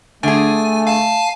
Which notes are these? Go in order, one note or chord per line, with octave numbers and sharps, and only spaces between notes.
D3 A3 G#4 G#5
F5 G#5 A5